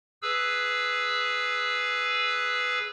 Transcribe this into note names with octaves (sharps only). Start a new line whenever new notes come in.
G#4 B4 E6